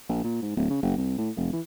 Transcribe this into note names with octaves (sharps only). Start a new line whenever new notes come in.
A#1
A#2
G#2
D1
C#3
F#1
C2
A2
F1
E3